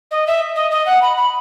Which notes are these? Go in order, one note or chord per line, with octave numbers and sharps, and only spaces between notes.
D#5
E5
D#5
D#5
F#5
B5
B5